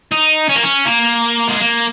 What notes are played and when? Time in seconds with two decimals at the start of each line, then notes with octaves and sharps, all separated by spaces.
0.12 D#4
0.49 C#4
0.55 A#3
0.63 C#4
0.85 A#3
1.48 G#3
1.59 A#3